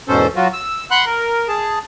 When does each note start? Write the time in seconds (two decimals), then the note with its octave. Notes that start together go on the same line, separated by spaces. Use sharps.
0.08 E2 G#2 B2 C#4 A4 C5
0.36 F#3 F4 F#4
0.53 E6
0.91 F#5 B5 C6 F#6
1.05 A#4
1.48 G#4 A5